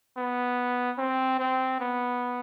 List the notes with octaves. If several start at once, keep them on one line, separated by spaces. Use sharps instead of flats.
B3
C4
C4
B3